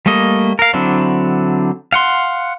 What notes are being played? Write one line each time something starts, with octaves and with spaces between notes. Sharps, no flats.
G3 A3 A#3 D#5
A#4 F5
D3 F#3 C4 D4 E4
F5 F#5 C6